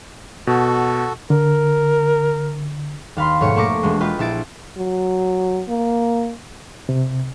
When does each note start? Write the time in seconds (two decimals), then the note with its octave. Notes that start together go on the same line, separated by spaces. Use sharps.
0.47 B2 F#4 A4
1.30 D3 A#4
3.16 D#2 F5 B5 C6
3.41 F1 G#2 B2 C#5 C#7
3.56 A3 A#3 C#6 D6 A#6
3.83 E1 G#3
4.00 F4 G4 B4 D#5
4.19 A#1 E4 A6 D7
4.77 F#3
5.69 A#3
6.89 C3